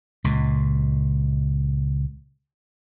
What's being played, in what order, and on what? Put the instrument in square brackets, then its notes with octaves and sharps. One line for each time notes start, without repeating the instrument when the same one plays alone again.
[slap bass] C#2 A#2